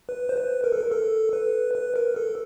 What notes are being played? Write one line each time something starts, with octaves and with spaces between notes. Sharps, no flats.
B4
C5
B4
A#4
A4
A#4
A4
B4
B4
A#4
A4